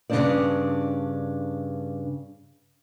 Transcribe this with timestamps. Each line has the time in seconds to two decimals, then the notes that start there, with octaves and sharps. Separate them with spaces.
0.10 G2 C#3 C4 D4 C5 D5